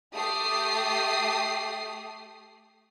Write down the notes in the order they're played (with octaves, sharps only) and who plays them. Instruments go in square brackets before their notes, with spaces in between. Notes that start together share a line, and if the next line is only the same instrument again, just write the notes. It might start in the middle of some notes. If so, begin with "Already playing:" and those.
[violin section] A3 G4 D#6 C7